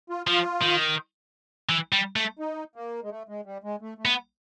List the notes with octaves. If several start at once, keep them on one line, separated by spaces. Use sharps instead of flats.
F4
F3 F4
D#3
E3
G3
A3
D#4
A#3
G#3
A3
G#3
G3
G#3
A3
A3
B3